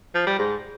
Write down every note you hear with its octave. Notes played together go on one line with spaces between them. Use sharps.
F3
G3
G#2